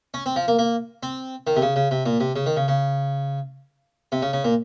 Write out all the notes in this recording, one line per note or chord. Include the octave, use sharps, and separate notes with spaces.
C#4
C4
F3
A#3
A#3
C4
D#3
C3
C#3
C#3
C3
A#2
C3
C#3
D#3
C#3
C#3
C3
C#3
C#3
A#2